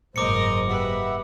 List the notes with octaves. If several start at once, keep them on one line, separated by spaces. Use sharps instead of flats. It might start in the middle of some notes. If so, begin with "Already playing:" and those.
F#1 G#2 A#4 C5 D#5 D6 C#7
G4 B4 E5 F#5